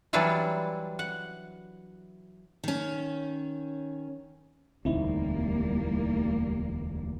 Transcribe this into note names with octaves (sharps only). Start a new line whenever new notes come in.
E3 F#3 G3 D4 E4 F4
F#5
D#3 C#4
E1 D2 G3 A#3 C4 D#4 E4